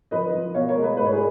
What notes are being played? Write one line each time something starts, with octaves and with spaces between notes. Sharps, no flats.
F3 B4 D#5
F3
B2 C#5 F5
A#4 C#5
G#3
B4 D#5
G#2 B4
C#5
G#4 B4